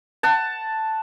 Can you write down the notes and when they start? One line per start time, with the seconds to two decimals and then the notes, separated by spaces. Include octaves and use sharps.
0.23 F#5 A5